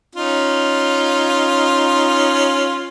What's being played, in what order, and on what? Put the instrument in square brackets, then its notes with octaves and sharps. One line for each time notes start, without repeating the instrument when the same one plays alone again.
[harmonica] C#4 D#4 F4